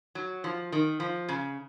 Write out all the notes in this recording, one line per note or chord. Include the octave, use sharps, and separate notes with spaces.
F#3
F3
D#3
F3
C#3